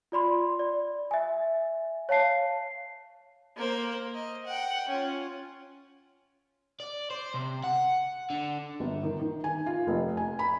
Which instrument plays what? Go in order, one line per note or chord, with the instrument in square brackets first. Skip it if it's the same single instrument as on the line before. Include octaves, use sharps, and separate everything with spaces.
[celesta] F4 D5 B5 C6
D5
E5 G#5
C#5 F5 A5 C7
[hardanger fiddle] A#3 C5
D#5
F#5 G5
C#4 F4
[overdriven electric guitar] D5
C5
C3
F#5
D3
[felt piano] G1
D#3
D#3
G#5
F4
F1
G#5
B5